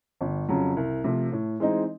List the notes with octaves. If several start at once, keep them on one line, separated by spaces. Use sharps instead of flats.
G1
F2 C#3 F#3
C2
C3 F3 A3
A2
E3 G#3 C4 D#4